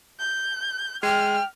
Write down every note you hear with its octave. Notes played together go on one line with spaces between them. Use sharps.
G6
G#3 G5 F6